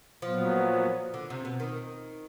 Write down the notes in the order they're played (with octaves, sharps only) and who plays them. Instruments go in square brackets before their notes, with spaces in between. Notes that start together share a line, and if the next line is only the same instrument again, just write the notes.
[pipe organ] A#2 F#3 B3 [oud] F3
[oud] D3
C3
B2
D#3